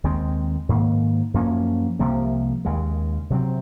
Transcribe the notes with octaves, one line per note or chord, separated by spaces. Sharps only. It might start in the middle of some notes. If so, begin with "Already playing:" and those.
D#2 D#3 G#3 C4
G#2 D#3 A#3
F#2 F3 A#3 C#4
C2 C3 F3 A#3
D#2 C#3 G#3
C3 F#3 C4